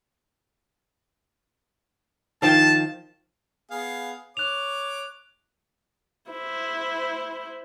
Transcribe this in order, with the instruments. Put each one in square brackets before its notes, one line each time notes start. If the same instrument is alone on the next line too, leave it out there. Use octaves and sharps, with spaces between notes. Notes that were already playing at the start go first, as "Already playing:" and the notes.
[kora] D#3 F3 F5 [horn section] A5
[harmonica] B3 G#4 F5
[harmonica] C#5 D6 [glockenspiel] F#6 F7
[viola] E4 C5